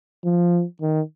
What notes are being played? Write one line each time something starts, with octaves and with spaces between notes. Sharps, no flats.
F3
D#3